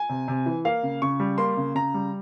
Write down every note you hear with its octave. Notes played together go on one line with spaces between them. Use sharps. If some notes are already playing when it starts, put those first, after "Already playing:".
Already playing: G#5
C3
C3
E3
A#3 F5
C#3
C#3 C#6
G3
A#3 C6
C#3
C#3 A#5
G3